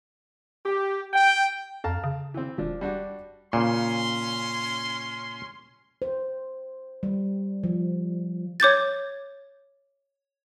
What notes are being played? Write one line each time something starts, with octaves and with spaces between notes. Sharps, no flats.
G4
G5
F2 F5 A5 A#5
C#3
E3 C4
E1 F3 D4
G3 D4 F#4
A#2 C#3 C#4 C6
C5
G3
F3
C#5 D6 G6 A6